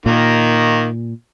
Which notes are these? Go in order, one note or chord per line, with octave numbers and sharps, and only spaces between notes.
A#2 D#3 A#3